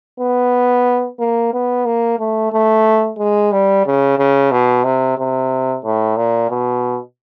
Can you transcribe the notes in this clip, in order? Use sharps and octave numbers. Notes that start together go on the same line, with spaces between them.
B3
A#3
B3
A#3
A3
A3
G#3
G3
C#3
C#3
B2
C3
C3
A2
A#2
B2